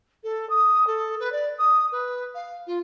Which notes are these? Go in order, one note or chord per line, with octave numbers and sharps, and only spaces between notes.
A4
D#6
A4
B4
D5
D#6
B4
F5
F4